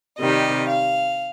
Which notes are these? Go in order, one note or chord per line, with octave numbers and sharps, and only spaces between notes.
C3 D#3 G3 D#5
F5